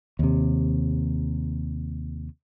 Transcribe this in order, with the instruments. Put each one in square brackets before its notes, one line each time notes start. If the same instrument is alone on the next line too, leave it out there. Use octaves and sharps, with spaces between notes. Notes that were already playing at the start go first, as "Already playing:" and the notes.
[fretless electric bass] D#2 C3